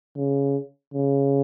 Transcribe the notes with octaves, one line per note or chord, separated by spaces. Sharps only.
C#3
C#3